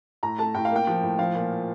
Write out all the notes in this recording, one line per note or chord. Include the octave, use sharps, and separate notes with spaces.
A2 A#5
A3 A5
A2 G5
F5
A#3 G5
F3
A2
F3 F5
A#2